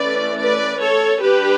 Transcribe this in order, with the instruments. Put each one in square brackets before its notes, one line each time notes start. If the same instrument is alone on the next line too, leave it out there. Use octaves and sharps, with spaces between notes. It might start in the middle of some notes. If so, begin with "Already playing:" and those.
Already playing: [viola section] E3 A3 C#4 B4 D5
B4 D5
A4 C#5
G3 D4 G4 B4